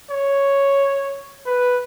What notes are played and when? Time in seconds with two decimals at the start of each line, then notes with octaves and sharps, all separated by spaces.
0.10 C#5
1.46 B4